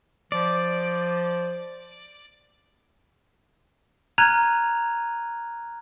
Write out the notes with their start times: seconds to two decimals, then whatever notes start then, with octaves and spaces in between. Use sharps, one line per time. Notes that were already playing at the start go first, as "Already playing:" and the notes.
0.32 F3 D5
4.18 A#5 F6 F#6 G#6 D#7 F7